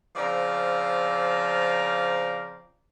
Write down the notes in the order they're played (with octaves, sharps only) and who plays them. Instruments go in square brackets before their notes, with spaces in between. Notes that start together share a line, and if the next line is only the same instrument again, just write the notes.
[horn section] C#3 F3 C4 D5 F5 A#5